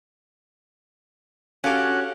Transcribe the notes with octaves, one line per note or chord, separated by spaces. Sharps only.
C#4 F#4 G4 A4 F5